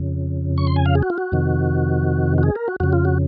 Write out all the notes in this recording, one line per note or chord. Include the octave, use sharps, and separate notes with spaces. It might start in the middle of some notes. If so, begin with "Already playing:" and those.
Already playing: F2 C#3
C#6
C6
G#5
F5
G#4
F#4
F4
F#4
F2 C3 D#3
F#4
G#4
A#4
F#4
F2 C#3 F#4
F4
F#4